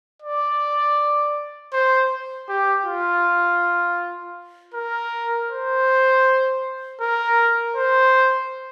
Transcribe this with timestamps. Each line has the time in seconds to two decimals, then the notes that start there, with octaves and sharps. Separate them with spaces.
0.22 D5
1.73 C5
2.49 G4
2.85 F4
4.74 A#4
5.50 C5
7.01 A#4
7.76 C5